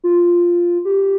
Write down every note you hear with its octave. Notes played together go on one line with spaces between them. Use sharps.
F4
G4